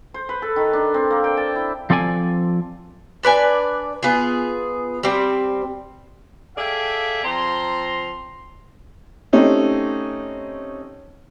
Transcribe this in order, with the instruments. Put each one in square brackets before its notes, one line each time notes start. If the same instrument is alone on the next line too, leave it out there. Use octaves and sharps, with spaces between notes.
[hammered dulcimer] C5
B4
A4
D#3
D4
C4
A#3
G5
A5
E4
[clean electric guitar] F3 C4 A4 D5 G#5
[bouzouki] D4 B4 D5 G#5
B3 F4 G#4
G3 C4
[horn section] G#4 A4 D5 E5 F5 G5
F3 C4 A#5 C6
[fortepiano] A3 C4 C#4 D#4 G4